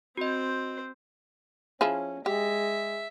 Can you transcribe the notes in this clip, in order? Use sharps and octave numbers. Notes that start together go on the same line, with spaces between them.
C4 F#4 C5 D#5
F3 C#4 E4 G#4
G#3 G4 E5